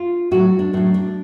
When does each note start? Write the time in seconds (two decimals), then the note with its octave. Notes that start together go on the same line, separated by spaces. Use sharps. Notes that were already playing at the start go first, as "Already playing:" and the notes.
Already playing: F4
0.31 A2 F#3 F#4
0.59 D4
0.73 A2 F#3 D4
0.94 D4